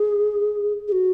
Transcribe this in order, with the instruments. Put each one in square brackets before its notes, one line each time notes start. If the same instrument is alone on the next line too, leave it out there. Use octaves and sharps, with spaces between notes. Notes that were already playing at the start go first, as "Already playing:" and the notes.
Already playing: [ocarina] G#4
G#4
F#4